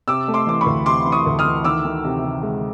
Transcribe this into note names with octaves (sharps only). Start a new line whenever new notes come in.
C3 D6 E6
A3
C6 D6
E3 D6
B5 C#6
D2
C3 C6 D6
E3
C#6 D#6
D2
D#6 F6
E3
D#3 D6 E6
D#3
C3
C3
G#3